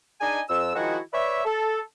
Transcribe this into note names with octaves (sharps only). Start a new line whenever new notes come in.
D4 D#4 G#4 D#5 G#5
F2 E6
D#3 F3 G#3 E4 F#4
B4 C#5 D5 E5
A4